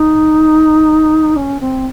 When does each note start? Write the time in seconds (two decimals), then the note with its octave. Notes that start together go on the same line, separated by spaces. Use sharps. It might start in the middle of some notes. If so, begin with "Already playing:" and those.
Already playing: D#4
1.36 C#4
1.60 C4